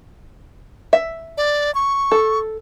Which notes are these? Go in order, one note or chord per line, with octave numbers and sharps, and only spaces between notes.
E5
D5
C#6
A4